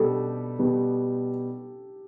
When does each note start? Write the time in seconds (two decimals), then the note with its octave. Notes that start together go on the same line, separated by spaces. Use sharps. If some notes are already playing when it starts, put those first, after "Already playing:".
Already playing: B2 G3 B3 G4 A4
0.59 B2 G3 B3